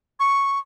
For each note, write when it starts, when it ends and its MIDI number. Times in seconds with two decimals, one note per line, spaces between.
0.20 0.59 85